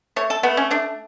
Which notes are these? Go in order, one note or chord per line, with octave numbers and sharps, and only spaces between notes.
A3 C#5
A4
A3 B3
C#4
A3 D4